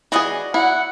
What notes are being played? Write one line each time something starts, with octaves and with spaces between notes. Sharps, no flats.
E3 F#4 G#4 D5 D#5
E4 F#5